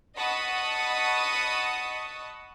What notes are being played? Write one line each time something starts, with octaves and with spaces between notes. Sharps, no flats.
D#5 F#5 A5 B5 C#6 D#6